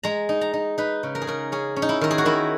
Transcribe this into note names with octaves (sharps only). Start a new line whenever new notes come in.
G#3 A#5
D#4
A#5
D#4
D#4 B4
C#3
A#4
G#4
C#3 A#4
C#4 G#4
C#4
D#4
E4
D#3 A#4
G#4
F#4
D#3 E4